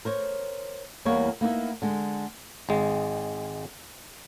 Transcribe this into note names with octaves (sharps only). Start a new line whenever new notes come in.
A#4 C5 C#5
E2 G3 A#3 A#4 C#5
A#3 B3 D#4 E4
D3 G#3
G#1 G#3